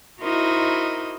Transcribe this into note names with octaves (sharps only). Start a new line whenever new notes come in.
D#4 E4 F#4 A#4 C5 D#5